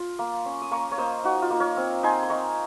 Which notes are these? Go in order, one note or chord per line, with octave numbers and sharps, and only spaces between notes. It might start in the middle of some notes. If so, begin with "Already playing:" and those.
Already playing: F4 C6
A#3
C#4
D#6
A#3 A#5 C#6
C#5
A#3 C5 D#5
D#4 F#4
F4
A#3
A#4 C#5
C4
D#4 G#5 C6
C6
D#4 A#5 C#6